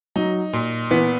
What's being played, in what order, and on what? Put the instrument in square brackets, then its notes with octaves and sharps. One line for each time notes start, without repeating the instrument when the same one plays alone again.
[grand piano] F#3 [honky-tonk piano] D#4
[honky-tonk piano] A#2
[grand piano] E3 [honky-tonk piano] B3